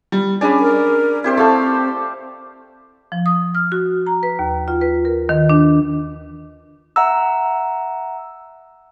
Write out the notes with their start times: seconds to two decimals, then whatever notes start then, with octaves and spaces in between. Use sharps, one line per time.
0.12 G3
0.41 C#4 D4 G#4 D5 B5
0.60 A#4
1.24 C4 E4 G4 C5
1.37 A3 A4 F5 A5
3.12 F3
3.26 D#6
3.55 F6
3.72 F#4
4.07 A#5
4.23 B4
4.39 D#2
4.68 F4
4.81 B4
5.05 A#4
5.29 D#3
5.50 D4
6.96 E5 F#5 A#5 E6